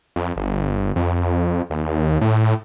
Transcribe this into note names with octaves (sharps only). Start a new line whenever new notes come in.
F2
G1
F2
D#2
A2